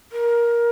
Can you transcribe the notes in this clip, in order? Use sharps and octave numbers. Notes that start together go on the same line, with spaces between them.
A#4